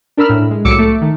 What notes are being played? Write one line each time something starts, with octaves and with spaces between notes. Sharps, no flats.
D4 A#4 B5 E6 F6
A2
G#3
C2 A2 F#3 D6 E6 C#7
A3
D#3 A3